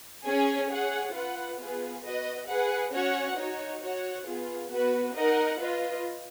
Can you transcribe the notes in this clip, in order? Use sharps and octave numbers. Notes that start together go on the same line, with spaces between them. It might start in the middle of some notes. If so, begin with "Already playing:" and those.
C#4 G#4 C#5 G#5
G#4 C#5 F#5
F4 B4 F#5
B3 F4 G#4 B4
F#4 B4 D#5
G#4 B4 F#5
C#4 F#4 C#5 F#5
D#4 F#4 C#5
F#4 C#5 F#5
B3 F4 G#4
B3 F#4 B4
D#4 A#4 D#5 F#5
F4 B4 D#5